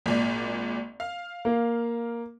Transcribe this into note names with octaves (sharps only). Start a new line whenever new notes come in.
G#1 A#2 D5
F5
A#3